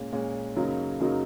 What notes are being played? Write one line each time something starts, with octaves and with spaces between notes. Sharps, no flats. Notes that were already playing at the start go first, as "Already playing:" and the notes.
Already playing: A#2 G#3 C#4
A#2 G#3 C#4
F#2 C#3 F#3 A#3 D#4
F#2 C#3 F#3 A#3 D#4